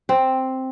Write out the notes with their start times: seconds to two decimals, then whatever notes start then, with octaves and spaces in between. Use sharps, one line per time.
0.09 C4